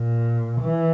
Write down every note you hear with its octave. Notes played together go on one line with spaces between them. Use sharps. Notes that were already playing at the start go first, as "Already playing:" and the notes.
Already playing: A#2
E3